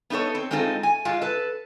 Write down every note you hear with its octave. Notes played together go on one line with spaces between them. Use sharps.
B3 D#4 F4 A4 C#5
C4
G#3 C4 D#4 F4 G4 A4
G#5
G#2 G#3 F4
A4 B4